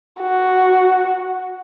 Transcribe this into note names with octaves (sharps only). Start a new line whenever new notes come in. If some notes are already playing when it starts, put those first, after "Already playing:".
F#4